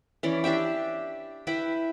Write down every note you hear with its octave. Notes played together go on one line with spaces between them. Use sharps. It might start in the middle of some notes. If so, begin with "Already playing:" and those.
E3 C#4 D5
D4 G4 E5 G5
E4 B4 E5 G5